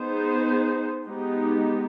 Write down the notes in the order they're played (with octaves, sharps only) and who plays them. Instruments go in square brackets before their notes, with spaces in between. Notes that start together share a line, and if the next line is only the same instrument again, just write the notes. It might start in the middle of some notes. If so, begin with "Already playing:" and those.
Already playing: [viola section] B3 D#4 G#4 C5
G#3 B3 D#4 G4